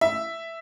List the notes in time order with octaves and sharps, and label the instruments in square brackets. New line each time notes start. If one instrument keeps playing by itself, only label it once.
[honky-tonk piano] E5